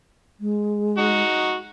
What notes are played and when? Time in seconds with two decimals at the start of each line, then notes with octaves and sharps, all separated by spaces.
0.40 G#3
0.98 D#4 F#4